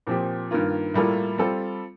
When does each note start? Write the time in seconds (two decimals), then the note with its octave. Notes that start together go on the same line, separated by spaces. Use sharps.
0.07 A#2 F3 C4 G4
0.51 G2 D#3 A#3 F4
0.94 A2 G3 A#3 F4 A4
1.38 G3 C4 F4 A4